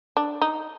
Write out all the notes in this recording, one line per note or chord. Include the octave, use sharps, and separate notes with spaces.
D4
D#4